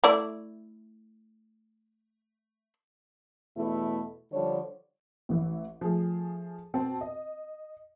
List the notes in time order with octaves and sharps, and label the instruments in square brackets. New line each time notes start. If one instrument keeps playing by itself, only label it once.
[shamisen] A3 E4 D5
[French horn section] E2 B2 A3 E4
D3 F3 G3 D4 C#5
[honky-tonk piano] A1 E3 E4
F3 A3 G#4
B2 C4 C5 A5
D#5